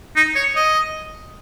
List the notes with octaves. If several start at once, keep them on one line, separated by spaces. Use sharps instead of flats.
D#4
C#5
D#5